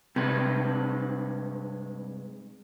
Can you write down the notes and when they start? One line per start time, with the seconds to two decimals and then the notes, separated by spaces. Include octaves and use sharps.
0.16 G2 C3 G#3 B4